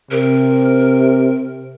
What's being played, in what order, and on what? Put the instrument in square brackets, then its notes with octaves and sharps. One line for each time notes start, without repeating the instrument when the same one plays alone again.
[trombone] C3 [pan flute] A#4